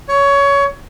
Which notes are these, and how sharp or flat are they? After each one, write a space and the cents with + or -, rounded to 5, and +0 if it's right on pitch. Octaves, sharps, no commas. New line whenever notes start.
C#5 +20